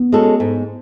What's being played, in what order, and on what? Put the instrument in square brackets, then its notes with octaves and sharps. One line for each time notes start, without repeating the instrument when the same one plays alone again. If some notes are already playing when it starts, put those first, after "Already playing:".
Already playing: [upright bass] B3
[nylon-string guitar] G#3 C#4 F#4 A4
G#2